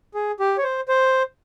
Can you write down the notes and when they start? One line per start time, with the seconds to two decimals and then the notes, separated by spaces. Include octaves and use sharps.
0.14 G#4
0.40 G4
0.58 C#5
0.64 C5
0.88 C5